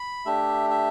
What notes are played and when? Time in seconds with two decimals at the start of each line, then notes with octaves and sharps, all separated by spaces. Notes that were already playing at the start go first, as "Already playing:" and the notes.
Already playing: B5
0.25 A3 D4 G4 E5
0.70 E5